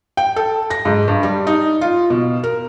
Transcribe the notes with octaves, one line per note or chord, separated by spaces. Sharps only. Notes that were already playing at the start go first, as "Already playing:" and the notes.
G5
A4
A#6
G#2
G2
G3
D#4
F4
B2
A#4